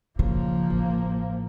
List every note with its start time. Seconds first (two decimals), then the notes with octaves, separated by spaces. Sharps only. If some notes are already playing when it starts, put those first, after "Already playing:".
0.19 C#3 F3 A#3
0.70 A1